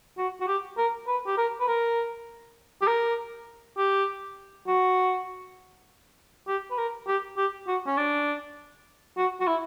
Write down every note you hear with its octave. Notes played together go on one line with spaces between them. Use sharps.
F#4
F#4
G4
A#4
B4
G4
A#4
B4
A#4
G4
A#4
G4
F#4
G4
B4
A#4
G4
G4
F#4
C#4
D4
F#4
F#4
E4